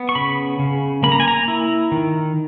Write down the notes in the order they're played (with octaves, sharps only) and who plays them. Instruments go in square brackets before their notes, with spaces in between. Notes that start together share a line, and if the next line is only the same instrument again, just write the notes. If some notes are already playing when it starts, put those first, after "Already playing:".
Already playing: [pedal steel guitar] B3
C#6
C#3 B5
C#3
A#3 B5
A#5
G#5
A#5
E4
D#3